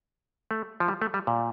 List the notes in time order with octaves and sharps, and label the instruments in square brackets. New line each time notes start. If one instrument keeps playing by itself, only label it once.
[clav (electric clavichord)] A3
F3
G3
A3
G3
A#2